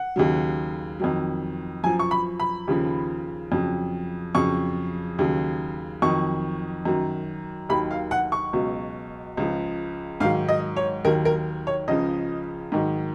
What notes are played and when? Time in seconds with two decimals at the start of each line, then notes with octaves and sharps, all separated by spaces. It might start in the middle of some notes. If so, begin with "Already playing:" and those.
Already playing: F#5
0.16 D#2 C#3 F#3
1.00 F2 D#3 F#3
1.84 F#2 F3 G#5
1.99 C#6
2.11 B5
2.40 B5
2.68 D#2 C#3 F3
3.52 F2 C#3 F#3
4.35 F2 C#3 F#3 C#6
5.19 D#2 C#3 F#3
6.02 F2 D#3 F#3 C#6
6.85 F#2 D#3 F#3
7.69 D#2 D#3 F#3 B5
7.91 F5
8.11 F#5
8.32 C#6
8.53 C#2 B2 F#3
9.37 C#2 C#3 F3
10.20 G#2 D#3 F#3 F5
10.49 D#5
10.76 C#5
11.05 D#2 D#3 F#3 A#4
11.25 A#4
11.67 C#5
11.88 C#2 C#3 F3 D#5
12.72 G#2 D#3 F#3